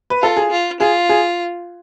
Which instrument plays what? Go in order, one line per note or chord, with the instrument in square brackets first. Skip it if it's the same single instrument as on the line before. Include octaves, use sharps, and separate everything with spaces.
[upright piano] B4
[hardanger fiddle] F4 [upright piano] A4
[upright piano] G#4
[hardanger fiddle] F4
[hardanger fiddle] F4 [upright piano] G#4
[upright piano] G#4